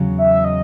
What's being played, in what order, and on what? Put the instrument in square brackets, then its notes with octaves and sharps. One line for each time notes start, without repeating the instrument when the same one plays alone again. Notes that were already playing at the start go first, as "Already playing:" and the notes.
Already playing: [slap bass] E2 C#3 F#3
[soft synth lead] E5
D#5